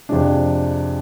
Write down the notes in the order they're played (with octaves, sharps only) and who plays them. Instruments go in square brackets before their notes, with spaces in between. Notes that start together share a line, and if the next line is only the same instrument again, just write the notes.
[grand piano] F2 C3 G#3 D4